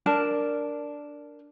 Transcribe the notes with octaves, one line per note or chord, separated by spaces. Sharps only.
D4 A#4 A5